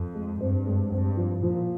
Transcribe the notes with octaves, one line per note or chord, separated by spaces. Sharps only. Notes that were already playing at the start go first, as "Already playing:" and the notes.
Already playing: F2
G#3
G2 C4
G#3
G2 C4
F3
A#2 F3